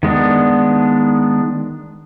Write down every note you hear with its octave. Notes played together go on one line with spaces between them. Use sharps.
D#3 G#3 B3 D4